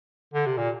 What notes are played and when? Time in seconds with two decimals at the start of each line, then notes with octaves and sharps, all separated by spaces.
0.34 D3
0.46 C3
0.58 A#2